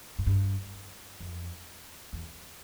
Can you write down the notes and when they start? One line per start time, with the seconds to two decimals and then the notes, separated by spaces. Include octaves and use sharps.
0.19 G#2
0.27 G2
1.20 F2
2.13 E2